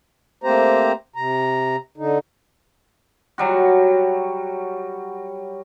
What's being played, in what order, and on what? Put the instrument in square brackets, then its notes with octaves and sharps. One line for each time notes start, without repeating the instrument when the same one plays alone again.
[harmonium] A3 A#3 C4 G4 C5 A#5
C3 A#5
D3 D#4
[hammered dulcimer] F#3 G3 F#4